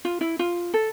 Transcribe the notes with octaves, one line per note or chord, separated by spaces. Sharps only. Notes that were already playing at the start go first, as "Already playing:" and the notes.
F4
E4
F4
A4